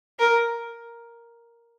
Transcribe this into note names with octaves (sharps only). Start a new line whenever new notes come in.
A#4